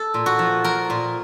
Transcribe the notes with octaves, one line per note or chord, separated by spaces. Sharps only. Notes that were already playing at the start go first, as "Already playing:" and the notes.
Already playing: A4
A#2
F#4
F3
F3 A#4
A#2